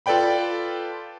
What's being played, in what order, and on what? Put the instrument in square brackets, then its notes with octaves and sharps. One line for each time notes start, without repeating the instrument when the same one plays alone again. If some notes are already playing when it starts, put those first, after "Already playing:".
[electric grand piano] F4 A4 B4 D5 G5 B5